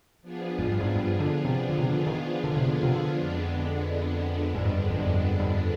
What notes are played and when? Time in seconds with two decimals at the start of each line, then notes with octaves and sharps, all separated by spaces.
0.22 F3 B3 D4 F4 G#4
0.59 G#2
0.69 G2
0.80 G#2
0.96 G2
1.20 D3
1.45 C3
1.69 D3
1.79 C3
1.88 D3
2.07 D#3
2.44 D3
2.57 C3
2.68 D3
2.83 C3
2.94 D3
3.17 F2 D3 G#3 B3 D4
4.55 G#2
4.66 G2
4.90 F2
4.99 G2
5.07 F2
5.16 G2
5.40 G2